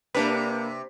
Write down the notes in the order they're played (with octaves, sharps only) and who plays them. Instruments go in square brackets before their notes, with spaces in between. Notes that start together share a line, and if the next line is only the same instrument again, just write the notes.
[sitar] C3 [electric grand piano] A#3 B6 [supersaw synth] D4 B4